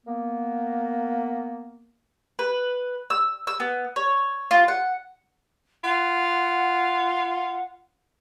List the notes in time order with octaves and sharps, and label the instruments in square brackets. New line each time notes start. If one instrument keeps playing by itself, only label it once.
[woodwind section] A#3 B3
[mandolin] B4
E6
E6
B3
C#5
F4
F#5
[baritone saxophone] F4 [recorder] F#5